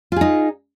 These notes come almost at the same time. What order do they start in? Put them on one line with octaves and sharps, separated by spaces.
F4 G#4 D#4